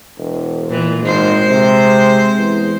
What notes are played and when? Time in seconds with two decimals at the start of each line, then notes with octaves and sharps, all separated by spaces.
0.18 E1
0.70 A#2 E3
1.02 G#1 G#3 C5
1.49 C3
2.38 E2